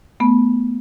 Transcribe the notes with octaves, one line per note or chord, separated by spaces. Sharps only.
A3 B3